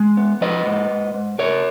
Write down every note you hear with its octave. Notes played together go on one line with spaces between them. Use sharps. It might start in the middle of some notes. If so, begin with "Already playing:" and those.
Already playing: G#3
B3
F3 B4 D#5
G#2
G#2
G#2
C#3 A#4 C#5